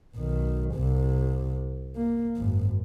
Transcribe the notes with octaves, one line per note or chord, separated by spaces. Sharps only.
B1 D#3
C2 C3
A#3
G#1 F#2